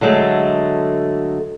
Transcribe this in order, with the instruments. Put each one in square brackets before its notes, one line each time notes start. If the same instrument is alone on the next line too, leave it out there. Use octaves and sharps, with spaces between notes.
[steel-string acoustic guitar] D3 F#3 G#3 A3